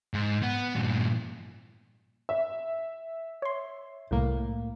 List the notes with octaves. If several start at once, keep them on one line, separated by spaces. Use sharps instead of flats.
G#2
B3
G2 A#2
E5
C#5 C6
C2 A2 A#3